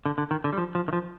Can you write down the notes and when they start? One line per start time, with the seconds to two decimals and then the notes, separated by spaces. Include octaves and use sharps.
0.06 D3
0.18 D3
0.31 D#3
0.44 D3
0.53 G3
0.58 F3
0.75 F3
0.88 D#3
0.93 F3